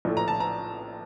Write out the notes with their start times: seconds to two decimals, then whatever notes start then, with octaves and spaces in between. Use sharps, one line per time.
0.05 A#1 A2 A3
0.17 A#5
0.28 A5
0.40 A#5